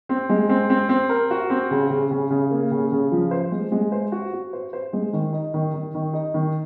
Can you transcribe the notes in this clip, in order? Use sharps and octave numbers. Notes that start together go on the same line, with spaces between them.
C4
G#3
C4
C4
C4
A#4
F#4
C4
C#3
C#3
C#3
C#3
A#3
C#3
C#3
F3
C5
G#3
G#3
C5
F#4
F#4
C5
C5
G#3
D#3
D#4
D#3
D#3
D#3
D#4
D#3